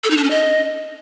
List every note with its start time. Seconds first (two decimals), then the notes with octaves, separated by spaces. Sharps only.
0.04 A4
0.10 D#4
0.17 D4
0.24 C#4
0.30 D#5